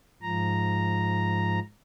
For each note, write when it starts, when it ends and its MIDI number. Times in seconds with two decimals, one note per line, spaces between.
0.22 1.60 44
0.22 1.60 53
0.22 1.60 82